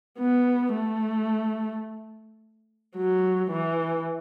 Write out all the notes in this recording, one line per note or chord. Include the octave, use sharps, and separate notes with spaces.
B3
A3
F#3
E3